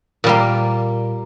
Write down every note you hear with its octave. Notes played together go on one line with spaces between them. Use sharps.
A#2 G3 A#3